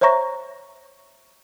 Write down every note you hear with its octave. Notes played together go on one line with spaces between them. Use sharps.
C5 C#5 E5 A#5 C#6 A#6